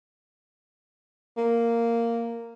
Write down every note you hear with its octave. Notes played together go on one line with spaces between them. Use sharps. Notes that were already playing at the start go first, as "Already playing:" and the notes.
A#3